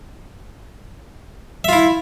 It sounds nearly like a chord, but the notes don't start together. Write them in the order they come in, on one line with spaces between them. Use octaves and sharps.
E5 F4 E4